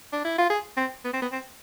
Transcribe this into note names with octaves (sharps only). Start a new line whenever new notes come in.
D4
E4
F4
G#4
C4
B3
C4
B3
C4